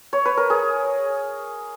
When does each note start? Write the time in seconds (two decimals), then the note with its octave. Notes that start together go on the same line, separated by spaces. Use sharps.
0.13 C#5
0.25 B4
0.37 A#4
0.50 G#4